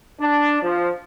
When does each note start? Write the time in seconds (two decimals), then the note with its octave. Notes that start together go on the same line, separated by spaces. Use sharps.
0.20 D4
0.62 F3